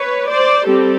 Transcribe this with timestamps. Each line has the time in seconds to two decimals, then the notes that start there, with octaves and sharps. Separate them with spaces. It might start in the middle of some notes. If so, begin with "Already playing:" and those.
Already playing: B4 C#5
0.29 C5 D5
0.66 G3 C4 G4 A4